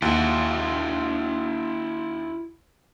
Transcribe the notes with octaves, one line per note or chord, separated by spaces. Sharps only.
D#2 E4 F#4